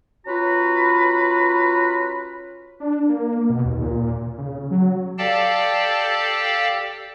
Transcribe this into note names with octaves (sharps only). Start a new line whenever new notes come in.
C#4 F4 F#4 B4 A#5
D4
A#3
B2
D#2
A#2
C#3
F#3
G4 A4 D5 F5 G5 A5